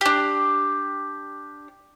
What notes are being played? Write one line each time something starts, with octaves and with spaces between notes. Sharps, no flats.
D4 G4